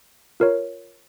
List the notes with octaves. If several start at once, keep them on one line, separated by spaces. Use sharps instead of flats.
F4 A#4 C#5